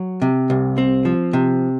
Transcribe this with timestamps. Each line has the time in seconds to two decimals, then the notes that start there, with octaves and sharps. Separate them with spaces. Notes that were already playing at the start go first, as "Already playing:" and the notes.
Already playing: F#3
0.22 C3
0.50 C2
0.78 C4
1.05 F3
1.33 C3